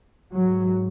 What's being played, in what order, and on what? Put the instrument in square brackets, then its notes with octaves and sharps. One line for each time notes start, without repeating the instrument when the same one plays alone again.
[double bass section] G#2 F#3